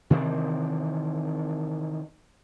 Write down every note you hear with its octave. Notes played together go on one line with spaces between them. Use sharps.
C3 D#3 E3 C4